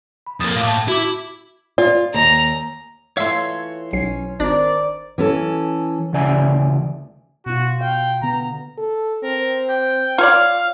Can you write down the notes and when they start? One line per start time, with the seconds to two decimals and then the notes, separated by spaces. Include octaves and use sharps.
0.27 B5
0.40 F2 A#3 D#6 A6 E7
0.56 A2 F5 D6
0.67 A5 G6
0.88 E4 F#4 D6
1.78 F4 D5
2.14 D#2 A#5
3.17 E3 A3 F4 C#5 E5 F5 C6 E6
3.93 B1 C#4 C7
4.40 G#1 D4 A#4 C5 D5
5.18 E3 C#4 A4
6.13 D2 C#3 E3 D5 G#5
7.46 B2 F4 F#4
7.81 F5 G5
8.22 D3 B3 A#5
8.78 A4
9.23 C4 A#4
9.69 G5
10.18 F4 C#5 D5 F5 F6